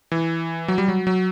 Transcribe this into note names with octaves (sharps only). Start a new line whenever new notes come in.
E3
F#3
G3
F#3
F#3